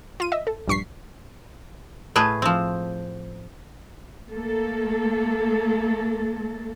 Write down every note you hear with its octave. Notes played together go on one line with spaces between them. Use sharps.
F4 D#7
D#5 E5
A4
A#1 G2 C#6 B6 C7
A2 A3 G#4 B4
F3 C4
A3 A#3 A4